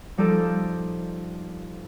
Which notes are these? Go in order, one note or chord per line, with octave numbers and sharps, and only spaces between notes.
F3 G3 D#4 G4 A4